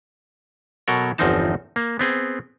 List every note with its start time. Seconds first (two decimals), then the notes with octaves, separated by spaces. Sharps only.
0.88 B2 F#3 A4 A#4
1.18 G1 E2 F3 C4 D#4 A5
1.76 A#3
1.99 B3 C4 G#4